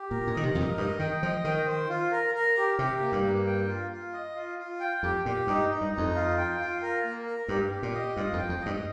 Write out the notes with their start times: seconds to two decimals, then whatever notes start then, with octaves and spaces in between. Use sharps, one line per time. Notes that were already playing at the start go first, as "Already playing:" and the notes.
Already playing: G4
0.10 A#2 A#4
0.27 A#2
0.33 D#3 D#5
0.43 C3
0.54 F2 A#4
0.60 G2
0.77 G2 D#5
0.99 D#3 G5
1.22 F3 D#5
1.44 D#3 G5
1.66 C5
1.89 F4
2.11 A#4
2.34 A#4
2.57 G4
2.79 C3 G4
3.01 A#3
3.12 G2
3.23 A#3
3.46 G5
3.68 F4
3.91 F4
4.13 D#5
4.35 F4
4.59 F4
4.80 G5
5.03 F2 G4
5.25 A#2 G4
5.47 G2 D#4
5.69 D#4
5.81 G2
5.92 D#4
5.98 F2
6.15 F4
6.38 G5
6.59 F4
6.82 A#4
7.04 A#3
7.26 A#4
7.48 G2 G4
7.72 G4
7.83 A#2
7.94 D#5
8.15 G2 F4
8.33 F2
8.38 G5
8.49 F2
8.60 D#5
8.66 G2